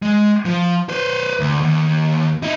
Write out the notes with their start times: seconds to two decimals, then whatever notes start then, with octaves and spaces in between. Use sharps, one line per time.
0.02 G#3
0.45 F3
0.89 B4 C5
1.40 D2
1.61 D#2
2.43 D#4 E4